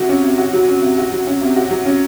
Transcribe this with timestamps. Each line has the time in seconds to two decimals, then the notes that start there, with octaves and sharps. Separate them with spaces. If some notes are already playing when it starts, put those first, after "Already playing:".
Already playing: C3 F#3 F#4
0.09 C#4
0.24 C3
0.38 F#4
0.53 F#3
0.68 C#4
0.82 C3
0.98 F#4
1.12 F#3
1.27 C#4
1.41 C3
1.56 F#4
1.71 F#3
1.85 C#4